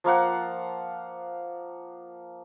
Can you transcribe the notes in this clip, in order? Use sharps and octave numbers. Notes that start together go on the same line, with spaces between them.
F3 A#3 F5 F#5